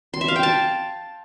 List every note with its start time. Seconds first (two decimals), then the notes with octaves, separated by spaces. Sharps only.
0.14 C6
0.21 E5
0.28 F5
0.36 G5
0.43 A5